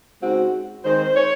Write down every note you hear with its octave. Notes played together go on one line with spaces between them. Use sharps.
C#3 G#3 C4 D#4 F#4
D#3 G#3 C4 C5
C#5